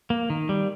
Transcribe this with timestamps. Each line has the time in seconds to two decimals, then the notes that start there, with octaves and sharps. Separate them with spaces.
0.10 A#3
0.30 D#3
0.49 G3